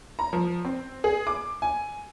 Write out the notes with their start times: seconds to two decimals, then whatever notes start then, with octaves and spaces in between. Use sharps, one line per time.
0.19 A#5
0.33 F3
0.65 C4
1.04 G#4
1.27 D6
1.62 G#5